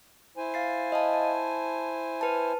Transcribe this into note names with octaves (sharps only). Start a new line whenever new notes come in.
E4 C5 G#5
F5 A6 C7
D#5 F5 A5
A5
B4 A5